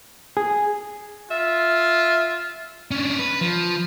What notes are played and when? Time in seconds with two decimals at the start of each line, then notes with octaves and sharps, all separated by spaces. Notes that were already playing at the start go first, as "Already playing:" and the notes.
0.37 G#4
1.31 F4 E5
2.91 C#4 D4
3.19 B4
3.41 F3